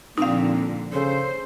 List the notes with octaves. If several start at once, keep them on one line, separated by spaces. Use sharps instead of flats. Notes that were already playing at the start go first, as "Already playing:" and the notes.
A#2 D3 F3 C4 D#4 F5
C#3 A4 C5